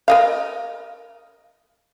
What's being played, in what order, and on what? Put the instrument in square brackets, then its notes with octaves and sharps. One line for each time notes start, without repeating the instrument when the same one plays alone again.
[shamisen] A#4 D#5 F5